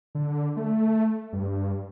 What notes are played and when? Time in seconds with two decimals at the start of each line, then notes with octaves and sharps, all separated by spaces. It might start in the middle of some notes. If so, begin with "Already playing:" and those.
0.15 D3
0.57 A3
1.33 G2